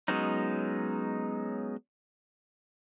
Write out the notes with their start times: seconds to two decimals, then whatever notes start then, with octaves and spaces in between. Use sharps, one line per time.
0.08 F#3 G#3 B3 C#4 D#4